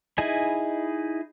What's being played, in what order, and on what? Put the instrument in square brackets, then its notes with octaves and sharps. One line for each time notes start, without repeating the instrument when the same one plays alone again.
[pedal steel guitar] D#4 E4 G#4 D#5 G#5